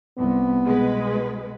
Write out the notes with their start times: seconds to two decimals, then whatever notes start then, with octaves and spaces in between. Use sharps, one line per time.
0.18 C2 B3
0.65 B2 G#3 B4